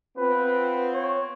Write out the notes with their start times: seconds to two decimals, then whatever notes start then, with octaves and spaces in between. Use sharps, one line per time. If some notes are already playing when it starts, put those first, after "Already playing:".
0.17 B3 C4 F4 B4
0.94 C#5